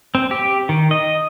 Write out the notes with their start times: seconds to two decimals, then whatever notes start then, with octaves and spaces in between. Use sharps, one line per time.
0.15 C4
0.31 G4
0.69 D#3
0.91 D#5